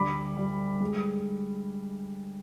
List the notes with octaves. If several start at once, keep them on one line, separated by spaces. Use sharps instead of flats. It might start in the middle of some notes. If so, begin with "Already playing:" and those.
Already playing: D2 G3 B5 D6
G3
G#3